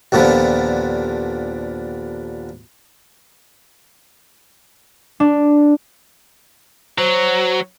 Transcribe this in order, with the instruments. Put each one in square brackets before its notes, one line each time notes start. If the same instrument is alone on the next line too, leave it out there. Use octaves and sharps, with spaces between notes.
[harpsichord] D#2 A#2 D3 F3 B3
[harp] D4
[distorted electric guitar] F#3 [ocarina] C5